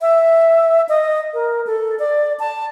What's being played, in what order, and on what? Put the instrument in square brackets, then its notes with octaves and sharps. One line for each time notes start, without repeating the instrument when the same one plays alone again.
[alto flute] E5
D#5
A#4
A4
D5
A5